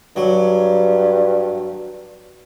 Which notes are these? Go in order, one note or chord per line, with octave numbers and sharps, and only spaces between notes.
G2 F#3